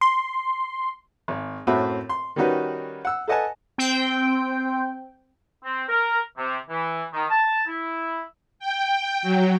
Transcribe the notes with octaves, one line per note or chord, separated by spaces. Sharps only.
C6
G#1
F#2 A2 C4 F#4 E5 B5
C6
D#3 G3 C#4 D#4 F#4 B4
F#5 E6
A4 B4 D#5 F#5 G#5 A5
C4 G5
C4
A#4
C3
E3
D#3
A5
E4
G5
F#3